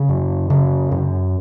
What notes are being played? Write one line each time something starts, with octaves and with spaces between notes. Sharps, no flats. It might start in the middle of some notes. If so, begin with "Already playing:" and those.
Already playing: C#3
F#2
C#3
F#2